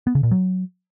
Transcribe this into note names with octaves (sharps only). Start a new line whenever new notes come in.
B3
C#3
A#2
F#3